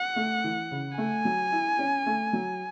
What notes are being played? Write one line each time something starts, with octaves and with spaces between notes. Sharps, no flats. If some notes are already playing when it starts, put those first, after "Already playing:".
Already playing: F#5
A3
E3
C#3
A3 G#5
F#3
E4
C#4
A3
F#3